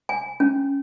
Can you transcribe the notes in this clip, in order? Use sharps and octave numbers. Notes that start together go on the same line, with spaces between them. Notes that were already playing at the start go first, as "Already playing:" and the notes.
G#5
C#4